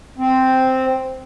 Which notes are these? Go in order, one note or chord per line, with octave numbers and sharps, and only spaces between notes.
C4